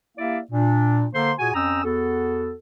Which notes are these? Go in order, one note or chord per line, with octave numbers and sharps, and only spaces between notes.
A#3 E4 G4 D5 E5 F5
A#2 D4
D3 A#3 A4 C5 C6
A#2 F#4 G#4 G#5
F2 C#4 G5 A#5 D#6 E6
E2 B3 F#4 A4